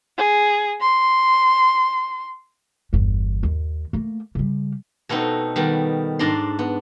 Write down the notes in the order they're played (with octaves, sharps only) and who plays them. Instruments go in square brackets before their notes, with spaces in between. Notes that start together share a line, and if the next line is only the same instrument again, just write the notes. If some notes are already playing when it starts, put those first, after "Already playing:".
[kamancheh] G#4
C6
[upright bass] G1 E2
D#2
A3 A#3
C#3 G3
[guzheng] B2 A3 B3 C4 D#4
D#3 G3 B3
G#2 D4 D5 A#5 C6
B3